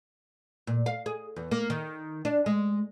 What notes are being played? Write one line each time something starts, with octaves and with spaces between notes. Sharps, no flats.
A#2
F5
G#4
E2
A#3
D#3
D4
G#3